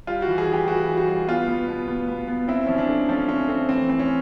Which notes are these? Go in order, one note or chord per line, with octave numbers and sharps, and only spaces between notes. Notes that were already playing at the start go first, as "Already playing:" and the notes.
G3 F4
F#4
E3
G#4
E3 G4
E3 F#4
G3
F#4
G3
B3 F4
B3
B2
B3
B3
B3
C4 E4
F3 C#4
D4
A3
F3 C#4
C4 C#4
A3 C4
E3 C4
C4
C#4